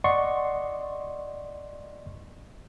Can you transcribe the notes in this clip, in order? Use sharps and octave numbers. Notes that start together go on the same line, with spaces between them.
D5 D#5 F#5 C6 C#6